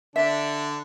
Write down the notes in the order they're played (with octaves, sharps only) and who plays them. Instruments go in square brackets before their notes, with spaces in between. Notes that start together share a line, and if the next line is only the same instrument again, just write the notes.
[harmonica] D3 D4 [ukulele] E5